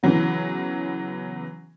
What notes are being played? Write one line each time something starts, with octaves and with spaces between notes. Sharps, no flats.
C#3 E3 F#3 B3